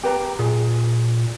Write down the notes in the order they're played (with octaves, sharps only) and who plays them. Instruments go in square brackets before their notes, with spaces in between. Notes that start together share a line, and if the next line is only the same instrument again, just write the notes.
[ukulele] G4 B4 A#5
[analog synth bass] A#2 [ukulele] G#4